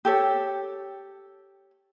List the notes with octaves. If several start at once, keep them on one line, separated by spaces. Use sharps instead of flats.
G4 A4 C#5